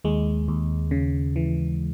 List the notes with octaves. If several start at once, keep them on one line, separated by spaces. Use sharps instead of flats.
D#2 G#3
D#2
C#3
E3